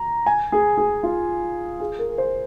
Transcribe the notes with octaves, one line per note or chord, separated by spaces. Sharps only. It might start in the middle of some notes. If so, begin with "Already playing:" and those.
Already playing: A#5
G#5
G#4
G#4
F4
G#4
A#4
C5